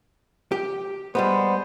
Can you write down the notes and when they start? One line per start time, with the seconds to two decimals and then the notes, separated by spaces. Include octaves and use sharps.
0.52 G4
1.15 G3 G#3 B3 C5